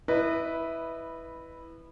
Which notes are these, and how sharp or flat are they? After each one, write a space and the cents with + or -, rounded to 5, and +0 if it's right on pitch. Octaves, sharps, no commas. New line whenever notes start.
E4 -10 B4 +0 D#5 -30